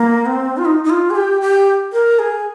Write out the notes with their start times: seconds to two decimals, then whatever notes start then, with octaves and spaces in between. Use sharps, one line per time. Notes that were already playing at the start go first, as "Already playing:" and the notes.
Already playing: A#3
0.26 C4
0.57 F4
0.65 D#4
0.84 D#4
0.90 F4
1.10 G#4
1.15 G4
1.41 G4
1.93 A#4
2.19 G#4